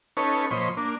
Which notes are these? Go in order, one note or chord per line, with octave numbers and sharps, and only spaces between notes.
C#4 D#4 A4 B4 C#5
A#2 F3 C5 C#5 D#5 B5
A#3 D4